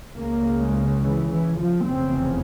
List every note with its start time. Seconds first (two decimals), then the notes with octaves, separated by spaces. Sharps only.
0.17 C#2 C#3 A#3
0.60 G#3
1.02 E3
1.30 E3
1.58 F3
1.86 F1 E2 C#3 C4